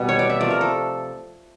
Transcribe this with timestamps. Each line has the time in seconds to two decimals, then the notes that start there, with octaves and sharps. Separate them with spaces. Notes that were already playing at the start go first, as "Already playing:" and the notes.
Already playing: B2 G3 B3
0.09 C#5
0.19 D5
0.30 E5
0.40 C3 F3 A3 D5
0.50 A#4
0.61 A4